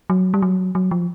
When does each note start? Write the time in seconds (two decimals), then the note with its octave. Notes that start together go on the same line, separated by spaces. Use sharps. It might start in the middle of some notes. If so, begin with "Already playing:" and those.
0.10 F#3
0.34 G3
0.42 F#3
0.75 F#3
0.91 F3